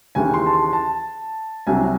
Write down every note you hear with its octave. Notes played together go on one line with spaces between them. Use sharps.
D#2 C#3 E3 G#5
C6
A5
C6
A5
C2 C3 F#3 G#5